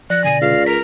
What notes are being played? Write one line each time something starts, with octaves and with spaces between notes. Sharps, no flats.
F3 D5 F#6 A#6
B2 D3 G#5
C#2 F5
A#4 B6